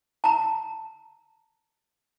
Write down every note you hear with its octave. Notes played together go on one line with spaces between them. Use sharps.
A5 A#5